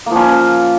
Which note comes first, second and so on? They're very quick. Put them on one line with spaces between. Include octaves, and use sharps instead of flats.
A#3 F3 C#4